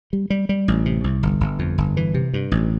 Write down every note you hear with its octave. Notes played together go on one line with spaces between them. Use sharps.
G3
G3
G3
A1
C3
C2
G1
G1
F2
G1
E3
C3
G2
A1